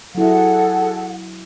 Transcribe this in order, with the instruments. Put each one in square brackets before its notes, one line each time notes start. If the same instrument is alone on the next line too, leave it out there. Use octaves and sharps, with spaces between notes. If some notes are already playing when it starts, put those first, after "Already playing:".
[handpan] F#3 E4 [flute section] G#4 A4 [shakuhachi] F#5